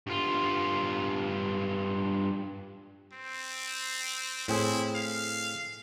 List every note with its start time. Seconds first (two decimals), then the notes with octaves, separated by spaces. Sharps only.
0.07 G2 F4
3.13 C4
4.48 A2 C4 E4 G#4
4.95 F5